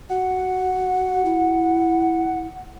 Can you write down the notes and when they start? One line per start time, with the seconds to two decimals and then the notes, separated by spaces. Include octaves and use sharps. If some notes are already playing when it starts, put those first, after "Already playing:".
0.10 F#4 F#5
1.25 E4